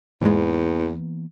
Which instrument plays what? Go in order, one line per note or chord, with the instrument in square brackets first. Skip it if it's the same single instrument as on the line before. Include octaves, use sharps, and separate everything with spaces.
[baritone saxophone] E2 [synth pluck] G#2 G#3 [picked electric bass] E3 A#3 B3